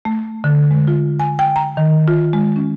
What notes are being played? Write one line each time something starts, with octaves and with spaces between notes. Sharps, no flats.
A3
D3
G#3
F4
G#5
G5
A#5
D#3
F4
G#3
C#4